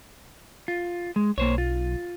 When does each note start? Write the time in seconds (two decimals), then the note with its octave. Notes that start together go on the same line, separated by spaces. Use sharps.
0.68 F4
1.16 G#3
1.38 B1 A#3 C5 C#5
1.58 F4